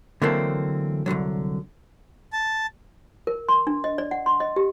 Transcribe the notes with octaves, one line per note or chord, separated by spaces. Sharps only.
D3 E3 F#3 A3 A#3 C4
C2 A#2 D3 F#3
A5
A#4
C6
D4
D#5
D5
F#5
C6
D#5
G4